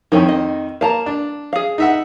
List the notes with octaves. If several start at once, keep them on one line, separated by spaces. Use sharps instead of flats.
F2 D#3 F3 C#4 E4
D#5
A#3 F5 A5 A#5
D4
G#4 F5
D#4 E5 F#5